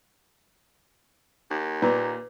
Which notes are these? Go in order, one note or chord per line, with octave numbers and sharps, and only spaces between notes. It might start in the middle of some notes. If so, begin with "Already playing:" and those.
D#2
A#2 B4